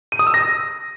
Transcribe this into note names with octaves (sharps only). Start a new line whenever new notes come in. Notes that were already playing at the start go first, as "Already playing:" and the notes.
D#7
D#6
E6
A#6